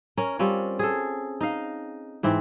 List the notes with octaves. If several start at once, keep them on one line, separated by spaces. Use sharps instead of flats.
C#4 A#4
G3 C4 C#4 F4
G#4 A4
D#4 D#5 F5
G#2 E3 C4